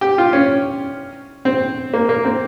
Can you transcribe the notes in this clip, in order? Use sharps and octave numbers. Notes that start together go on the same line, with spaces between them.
G4
F4
C#4
C4
A#3
A#3
C4